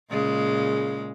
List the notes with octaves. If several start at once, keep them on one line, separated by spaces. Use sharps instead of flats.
A#2 C#3 G#3